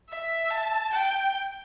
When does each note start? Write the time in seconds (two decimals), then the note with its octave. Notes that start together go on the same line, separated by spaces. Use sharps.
0.10 E5
0.51 A5
0.93 G5